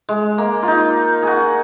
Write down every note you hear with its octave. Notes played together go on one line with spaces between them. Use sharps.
G#3
A#3
F4
D#4
F#4 G#4